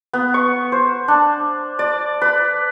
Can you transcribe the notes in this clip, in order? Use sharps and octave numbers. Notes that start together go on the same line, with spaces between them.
B3
C#6
C5
D4
D5
B4